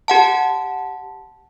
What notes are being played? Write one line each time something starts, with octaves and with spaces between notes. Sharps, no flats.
G4 F#5 A5